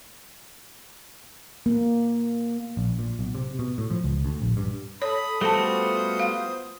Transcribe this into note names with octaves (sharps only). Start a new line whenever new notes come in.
A#3
A#1
A#2
B1
C3
B2
A2
F3
C#2
D2
A#1
G2
A4 C#5 B5 D#6
G3 A3 B3 F4 F#4 A4 C5 A5
F5